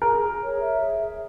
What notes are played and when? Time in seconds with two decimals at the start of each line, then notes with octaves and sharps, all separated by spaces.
0.02 G#4 A#4
0.22 G#4
0.41 C#5
0.60 E5
0.80 G#4
0.99 G#4